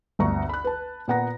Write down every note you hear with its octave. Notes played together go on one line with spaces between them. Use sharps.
G1 D2 A#5 C#6
B5 F#6
B4 A5
A#2 B3 F#5 A#5 A#6